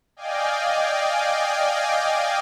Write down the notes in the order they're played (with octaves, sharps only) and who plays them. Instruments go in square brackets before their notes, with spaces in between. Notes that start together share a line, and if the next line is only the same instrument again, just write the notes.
[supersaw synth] D5 D#5 F5 G5 G#5